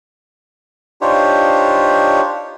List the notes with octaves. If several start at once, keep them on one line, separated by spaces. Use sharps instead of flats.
D4 D#4 F4 G4 C5 C#5